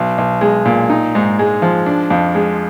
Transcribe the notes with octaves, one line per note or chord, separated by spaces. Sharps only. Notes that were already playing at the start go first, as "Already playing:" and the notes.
Already playing: B1
B1
G#3
A#2
D#4
G#2
G#3
F3
D4
F2
G#3